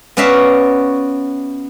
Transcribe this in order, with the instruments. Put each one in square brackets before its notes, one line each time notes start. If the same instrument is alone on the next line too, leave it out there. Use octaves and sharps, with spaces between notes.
[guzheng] B3 C#4 F#4 D5 E5 F5